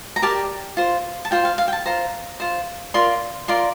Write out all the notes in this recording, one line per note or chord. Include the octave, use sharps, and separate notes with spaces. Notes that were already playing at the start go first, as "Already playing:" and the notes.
A#5
G4 A#4 D5 A5
F4 C5
A5
F4 C5 G5
F5
F5
G5
A5
F4 C5 A#5
F4 C5
F4 A#4 D5 C6
F4 A#4 D5 C6